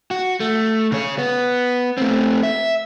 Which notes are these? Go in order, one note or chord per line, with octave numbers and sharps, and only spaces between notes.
F#4
A3
C#3 C#5
B3
A3 C4
E5